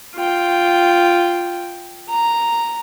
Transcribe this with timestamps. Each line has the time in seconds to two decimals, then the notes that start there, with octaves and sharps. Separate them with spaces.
0.15 F4 G5
2.09 A#5